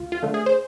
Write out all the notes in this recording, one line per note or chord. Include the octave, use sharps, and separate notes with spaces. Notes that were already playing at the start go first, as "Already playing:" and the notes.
Already playing: D2 F4
F4
D3 A3
G#4
C5